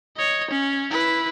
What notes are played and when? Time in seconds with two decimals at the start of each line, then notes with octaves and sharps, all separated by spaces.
0.17 C#5 D#5
0.51 C#4
0.91 E4 B4